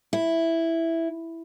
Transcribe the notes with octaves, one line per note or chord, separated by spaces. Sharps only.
E4